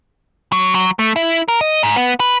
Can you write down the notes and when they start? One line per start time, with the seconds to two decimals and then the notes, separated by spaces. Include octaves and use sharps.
0.52 F#3
0.75 F#3
0.99 A3
1.16 E4
1.48 A#4
1.61 D#5
1.83 G#2
1.96 B3
2.20 B4